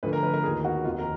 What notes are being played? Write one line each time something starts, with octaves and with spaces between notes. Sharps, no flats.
D2 D3 F3 B4
A#4
B4
A#4
D#2 D#3 G#4
F#4
F1 D#2 D#3 F4
A#4